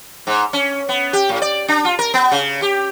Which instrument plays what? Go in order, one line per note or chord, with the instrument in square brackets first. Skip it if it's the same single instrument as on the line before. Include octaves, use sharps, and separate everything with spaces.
[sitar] G#2
C#4
B3
G4
A2
D5
D4
F4
A#4
B3
C#3
G4